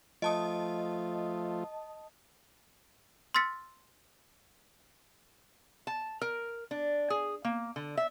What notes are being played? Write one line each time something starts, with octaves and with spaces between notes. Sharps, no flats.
F3 A3 F4 D#5 A5 D#6
C6 E6 F6 A6 B6 C#7
A5
A#4
D4
G#4
A#3
D3
E5